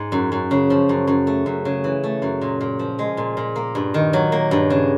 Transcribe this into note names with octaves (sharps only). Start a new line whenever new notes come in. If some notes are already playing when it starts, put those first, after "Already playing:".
Already playing: G#2
F#2
F#2
C#3
F3
F#2
F#2
A3
F#2
C#3
E3
A3
F#2
A#2
A#2
F3
G#3
A#2
A#2
A#3
G2
D#3
F#3
A#3
G2
C#3